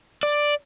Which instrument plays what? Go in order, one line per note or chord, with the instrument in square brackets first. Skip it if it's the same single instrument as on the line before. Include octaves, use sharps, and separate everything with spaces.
[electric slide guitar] D5